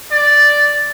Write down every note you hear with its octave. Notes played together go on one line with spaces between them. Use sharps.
D5